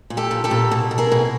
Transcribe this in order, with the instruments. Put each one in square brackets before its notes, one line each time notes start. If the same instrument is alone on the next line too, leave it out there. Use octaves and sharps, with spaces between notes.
[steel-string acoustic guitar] A#2
G4 A4
A#2
G4 A4
A#2
B2
B2
G#4 A#4
B2